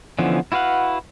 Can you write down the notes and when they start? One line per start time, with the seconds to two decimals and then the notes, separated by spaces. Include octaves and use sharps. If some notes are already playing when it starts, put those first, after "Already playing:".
0.19 D3 E3 F3 B3 C#4
0.52 E4 F#4 B4 F5 F#5